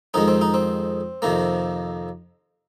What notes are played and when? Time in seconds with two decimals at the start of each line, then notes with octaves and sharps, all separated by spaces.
0.14 F2 D#3 G#3 D#4
0.28 C4
0.41 D#4
0.54 C4
1.22 F2 C3 D#3 A#3